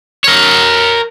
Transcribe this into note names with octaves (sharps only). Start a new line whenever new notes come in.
A#4 C#5